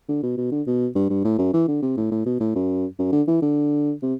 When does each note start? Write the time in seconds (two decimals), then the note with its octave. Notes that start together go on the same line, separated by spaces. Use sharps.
0.09 D3
0.23 B2
0.38 B2
0.52 D3
0.67 B2
0.95 G2
1.10 G2
1.25 A2
1.39 F#2
1.54 E3
1.68 D3
1.82 C3
1.97 A2
2.12 A2
2.26 B2
2.40 A2
2.55 F#2
2.99 F#2
3.12 D3
3.28 E3
3.42 D3
4.03 C3